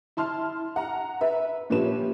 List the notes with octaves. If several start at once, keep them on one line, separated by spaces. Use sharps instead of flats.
E4 A5 C6 F6
F#5 A#5
B4 E5
A#2 F3 C#4 G4 B4 E7